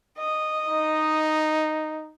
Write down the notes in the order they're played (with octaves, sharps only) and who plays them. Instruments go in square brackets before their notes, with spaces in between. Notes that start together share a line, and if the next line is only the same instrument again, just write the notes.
[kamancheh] D#5
[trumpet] D#4